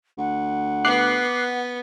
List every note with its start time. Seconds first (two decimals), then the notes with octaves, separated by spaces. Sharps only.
0.18 D2 F#5
0.85 B3 D6 F#6 C7